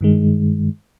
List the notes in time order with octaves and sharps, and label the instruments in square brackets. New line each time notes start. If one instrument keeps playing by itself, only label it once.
[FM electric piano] G2 D#3 G#3